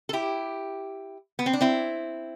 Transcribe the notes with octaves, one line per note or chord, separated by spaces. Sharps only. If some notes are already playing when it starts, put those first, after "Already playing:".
A4
E4 G4
B3
C4
D4
C4 E4